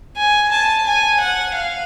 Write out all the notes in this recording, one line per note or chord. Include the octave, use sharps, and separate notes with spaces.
G#5
A5
G#5
F#5
F5